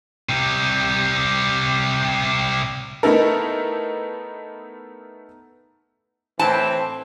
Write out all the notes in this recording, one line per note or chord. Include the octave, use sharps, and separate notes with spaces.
C3 G3
A3 B3 D#4 E4 A4 A#4
A2 E3 C4 A5